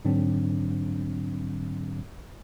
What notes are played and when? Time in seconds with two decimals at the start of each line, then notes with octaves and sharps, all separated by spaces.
0.05 G#2 D3 F#3 C4 D4